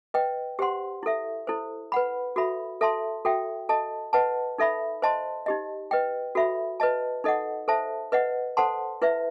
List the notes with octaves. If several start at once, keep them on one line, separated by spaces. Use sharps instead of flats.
B4 D#5 G5
G4 C5 F#5 C6
E4 A4 E5
E4 A4 C5
B4 F#5 B5
F#4 A4 E5 B5
A4 E5 A5 C6
F#4 A4 E5 G5
A4 D#5 A5
B4 D#5 F#5 A5
D#4 A4 E5 B5
C5 D#5 A5 C6
D#4 G4 D#5
B4 D#5 G5
F#4 A4 E5 B5
B4 D#5 A5
D#4 A4 D#5 F#5
A4 C5 E5 A5
B4 D#5 F#5
A4 C5 F#5 A5 C6
E4 B4 E5